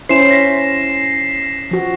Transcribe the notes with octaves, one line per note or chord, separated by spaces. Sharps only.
C#4 E4 C5 C7 E7
A#6 B6
F3 F#4